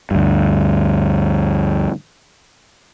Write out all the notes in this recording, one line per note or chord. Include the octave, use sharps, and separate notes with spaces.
D2 G2